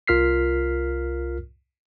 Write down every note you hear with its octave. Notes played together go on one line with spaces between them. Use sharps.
C2 F4 A#4 F6 B6 C7